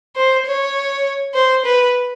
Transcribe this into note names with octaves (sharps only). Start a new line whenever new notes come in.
C5
C#5
C5
B4